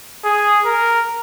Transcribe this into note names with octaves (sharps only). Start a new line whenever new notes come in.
G#4
A#4